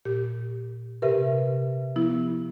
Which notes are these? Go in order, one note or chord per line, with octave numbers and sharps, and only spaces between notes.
A#2 G4
C3 G4 A#4 B4 E5
F3 B3 E4